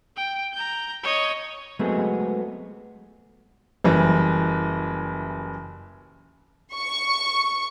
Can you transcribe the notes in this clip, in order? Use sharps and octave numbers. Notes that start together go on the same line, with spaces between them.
G5
A#5 G6
C#5 D#5
F#3 G#3 A3 B3 C4 G#4
F#1 E3 G3
C#6